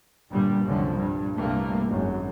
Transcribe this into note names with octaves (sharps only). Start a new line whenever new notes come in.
G1 G2 A#2 G3
C2 F#2 D3 F3
G2 A#2
C2 G2 G3 A3 A#3
G#1 F#2